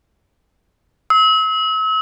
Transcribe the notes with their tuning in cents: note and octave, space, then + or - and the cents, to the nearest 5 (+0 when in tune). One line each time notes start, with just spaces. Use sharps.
E6 -40